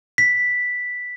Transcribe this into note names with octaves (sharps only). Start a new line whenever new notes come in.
B6